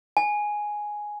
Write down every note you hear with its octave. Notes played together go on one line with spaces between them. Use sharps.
G#5